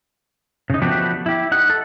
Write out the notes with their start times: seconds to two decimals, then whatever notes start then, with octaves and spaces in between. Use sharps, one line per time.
0.70 C#3 D#4
0.82 F3 A3 B3 D4 F#4 G4
1.26 E4 G4
1.52 D#4 F#5
1.70 A4